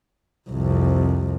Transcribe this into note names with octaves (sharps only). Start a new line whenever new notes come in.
C2 F2